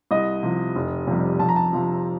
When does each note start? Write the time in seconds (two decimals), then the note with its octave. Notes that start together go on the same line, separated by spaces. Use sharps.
0.11 C2 D#5
0.43 C3 F3
0.75 F1
1.07 F2 C3 G3
1.39 F2 A5
1.49 A#5
1.56 A5
1.73 C3 F3